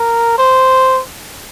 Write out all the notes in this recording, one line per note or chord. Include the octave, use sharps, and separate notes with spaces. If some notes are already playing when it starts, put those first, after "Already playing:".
Already playing: A#4
C5